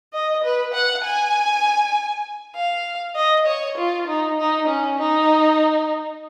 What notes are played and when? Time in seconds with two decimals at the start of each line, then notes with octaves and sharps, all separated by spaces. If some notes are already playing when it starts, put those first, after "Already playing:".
0.13 D#5
0.43 B4
0.74 F#5
1.04 G#5
2.56 F5
3.16 D#5
3.47 C#5
3.78 F4
4.07 D#4
4.38 D#4
4.67 C#4
4.99 D#4